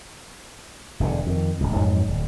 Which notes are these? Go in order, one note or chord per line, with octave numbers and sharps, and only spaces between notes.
E1 G2 A#2 D3
F2 D#3
D1 C#2
F2 G#2 B2 F#3
D1